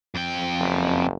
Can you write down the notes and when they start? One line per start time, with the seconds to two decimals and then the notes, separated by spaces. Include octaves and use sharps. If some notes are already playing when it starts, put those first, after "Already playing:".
0.15 F2 G5
0.59 F#1